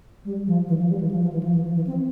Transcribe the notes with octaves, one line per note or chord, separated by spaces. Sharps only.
G3
F3
E3
F3
G3
E3
F3
F3
E3
F3
E3
F3
E3
C4